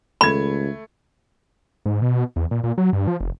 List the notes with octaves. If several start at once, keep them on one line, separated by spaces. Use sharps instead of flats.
C#2 A3 B5 G#6
G#2
B2
E2
A#2
A#2
F#3
G2
F3
F1